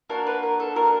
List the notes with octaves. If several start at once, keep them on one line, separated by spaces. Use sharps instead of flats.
A#3 D4 F#4 A#4
B4
A#4
A4
A#3 D4 F#4 A#4